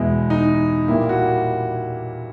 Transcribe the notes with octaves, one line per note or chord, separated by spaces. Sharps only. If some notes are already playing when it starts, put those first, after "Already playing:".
Already playing: E2 B2 G#3 E4
D#4
A#2 G3 A#3 E4
F#4